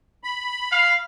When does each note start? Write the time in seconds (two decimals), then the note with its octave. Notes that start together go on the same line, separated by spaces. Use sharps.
0.24 B5
0.72 F5